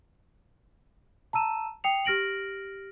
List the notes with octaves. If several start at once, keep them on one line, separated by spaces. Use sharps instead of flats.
A5 A#5 E6 D#7 E7
G5 D#6 C7 C#7 F7
G4 F6 A#6 D7 F#7